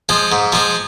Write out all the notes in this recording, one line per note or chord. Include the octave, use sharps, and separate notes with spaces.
F3 G#3
G#2
F3 G#3